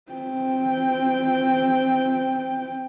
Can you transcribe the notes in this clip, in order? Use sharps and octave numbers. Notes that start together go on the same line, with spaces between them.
C4 G5